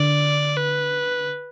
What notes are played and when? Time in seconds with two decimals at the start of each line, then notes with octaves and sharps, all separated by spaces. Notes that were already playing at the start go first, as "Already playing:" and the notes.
Already playing: D3 D5
0.57 B4